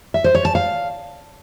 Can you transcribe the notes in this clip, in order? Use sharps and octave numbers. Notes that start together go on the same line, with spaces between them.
E5
C5
C#5
A5
F5